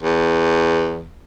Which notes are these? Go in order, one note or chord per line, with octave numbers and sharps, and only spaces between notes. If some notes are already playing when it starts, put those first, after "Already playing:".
E2